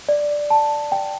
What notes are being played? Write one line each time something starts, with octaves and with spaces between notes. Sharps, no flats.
D5
A5
G5